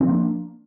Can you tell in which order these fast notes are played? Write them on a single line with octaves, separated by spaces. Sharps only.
C4 F3 A#3 D4